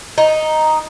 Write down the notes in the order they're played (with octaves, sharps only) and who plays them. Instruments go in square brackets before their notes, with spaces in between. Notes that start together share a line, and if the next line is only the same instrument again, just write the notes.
[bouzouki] D#4